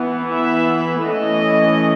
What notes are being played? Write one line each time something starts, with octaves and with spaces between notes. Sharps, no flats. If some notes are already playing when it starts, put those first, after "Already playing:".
Already playing: E3 B3
E5
E3 A3 C#4 D#5